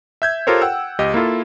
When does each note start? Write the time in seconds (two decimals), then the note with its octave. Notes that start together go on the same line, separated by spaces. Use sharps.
0.22 E5 G6 G#6
0.47 F4 G4 A4 A#4 C5 C#5
0.61 F#5 G5 E6
0.99 C#2 G4 D#5
1.14 A#3 E4 F4 A4